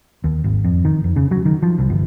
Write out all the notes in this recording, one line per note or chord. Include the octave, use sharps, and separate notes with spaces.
D#2
G#1
F2
D#3
F2
C#3
F#3
D#3
F3
C2
G1